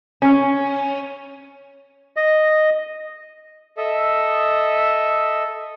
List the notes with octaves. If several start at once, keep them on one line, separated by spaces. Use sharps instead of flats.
C#4
D#5
A4 D#5 E5